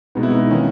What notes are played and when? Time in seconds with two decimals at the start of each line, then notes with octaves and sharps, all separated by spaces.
0.15 B2 G#3 B3 D#4
0.23 E4
0.30 D#4
0.51 D#3 A#3 C#4